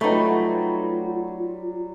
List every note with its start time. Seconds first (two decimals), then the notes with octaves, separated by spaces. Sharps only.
0.01 F#3 G3 A3 D#4 F4 B4 C#6